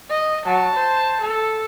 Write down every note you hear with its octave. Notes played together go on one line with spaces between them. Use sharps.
D#5
F#3 A5
C5
A4